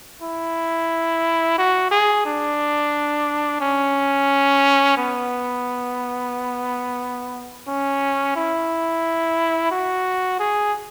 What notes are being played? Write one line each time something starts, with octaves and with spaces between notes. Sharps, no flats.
E4
F#4
G#4
D4
C#4
B3
C#4
E4
F#4
G#4